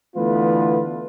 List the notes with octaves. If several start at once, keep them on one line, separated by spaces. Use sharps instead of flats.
D3 E3 A3 B3 F4 B4